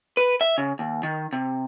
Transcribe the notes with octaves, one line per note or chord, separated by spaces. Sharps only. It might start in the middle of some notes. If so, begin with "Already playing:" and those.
B4
E5
C#3
D#2
D#3
C3